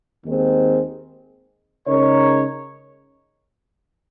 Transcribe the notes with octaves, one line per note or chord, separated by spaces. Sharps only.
D#2 D#3 G#3 C4
C#3 G#3 D#4 A#4 C#5